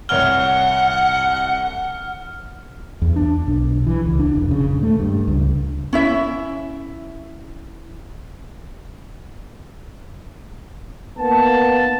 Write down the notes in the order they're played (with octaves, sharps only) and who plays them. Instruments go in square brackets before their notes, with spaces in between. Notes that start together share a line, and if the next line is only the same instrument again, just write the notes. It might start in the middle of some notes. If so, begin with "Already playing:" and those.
[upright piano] C2 C#5 G7 [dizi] F#5 [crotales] F6
[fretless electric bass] E2
D4
B1
E3
C#2
D4
F1
C#3
D#1
A3
G2
C#2
[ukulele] C#4 E4 E5
[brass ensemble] A#3 B3 D#4 A5